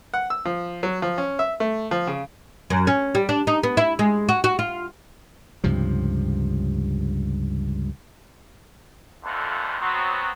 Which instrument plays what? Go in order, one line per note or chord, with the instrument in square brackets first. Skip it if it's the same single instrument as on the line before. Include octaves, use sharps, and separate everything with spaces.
[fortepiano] F#5
E6
F3
F#3
F3
C#4
E5
A3
F3
C#3
[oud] F#2
C#4
G3
D4
D#4
B3
E4
G#3
F#4
F#4
F4
[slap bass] C#2 G2 C3 F3
[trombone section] F2 A#2 D3 D#3 A3 B3
F#3 B3 C4